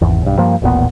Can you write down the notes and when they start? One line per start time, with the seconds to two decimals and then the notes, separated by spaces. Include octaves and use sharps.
0.01 G#1 E2
0.22 B1 G2
0.38 G2 F3 A#3
0.62 D#1 A1 A#2 B3